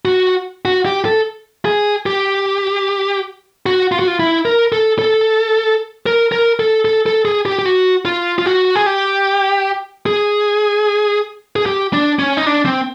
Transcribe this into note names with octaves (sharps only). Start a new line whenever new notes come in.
F#4
F#4
G4
A4
G#4
G4
F#4
F4
F#4
F4
E4
A#4
A4
A4
A#4
A#4
A4
A4
A4
G#4
G4
G4
F#4
F4
F4
F#4
G#4
G4
G#4
G#4
G4
D4
C#4
D#4
D4
C4